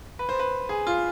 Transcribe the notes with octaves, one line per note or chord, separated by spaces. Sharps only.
B4
C5
B4
G#4
F4